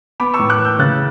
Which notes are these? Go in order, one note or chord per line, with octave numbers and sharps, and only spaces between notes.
B3 B5 D6
C#6 E6
A2
D6 F#6
E3
E6 G6
C#3 F#6 A6